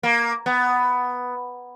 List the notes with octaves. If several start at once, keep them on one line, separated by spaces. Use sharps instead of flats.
A#3
B3